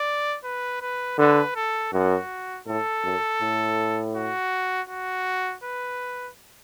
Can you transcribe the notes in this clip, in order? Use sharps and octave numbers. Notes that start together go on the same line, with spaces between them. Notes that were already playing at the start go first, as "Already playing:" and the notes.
Already playing: D5
B4
B4
D3 B4
A4
F#2 F#4
A2 A4
F#2
A2
F#4
F#4
B4